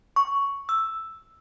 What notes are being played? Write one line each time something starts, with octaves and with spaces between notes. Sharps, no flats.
C#6
E6